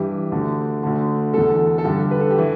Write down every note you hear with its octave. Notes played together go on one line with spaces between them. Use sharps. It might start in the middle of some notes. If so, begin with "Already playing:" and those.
Already playing: G2 E3 G4
D2 D3
D2 D3
E2 D3 A4
A4
G2 D3 G4
B4
A4
G4
E3